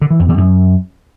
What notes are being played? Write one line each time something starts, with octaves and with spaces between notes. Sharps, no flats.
D3
E3
F2
E2
F#2